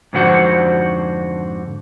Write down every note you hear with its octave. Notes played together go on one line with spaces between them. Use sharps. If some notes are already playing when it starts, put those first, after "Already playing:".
F2 G#2 D3 F#4 C5